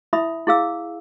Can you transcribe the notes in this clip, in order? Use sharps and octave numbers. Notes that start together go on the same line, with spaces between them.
E4 E5 B5 D#6
E4 G#4 F5 E6